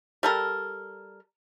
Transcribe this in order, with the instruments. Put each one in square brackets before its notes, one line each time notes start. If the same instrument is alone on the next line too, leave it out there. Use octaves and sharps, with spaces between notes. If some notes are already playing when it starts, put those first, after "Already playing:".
[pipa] G3 A4 A#4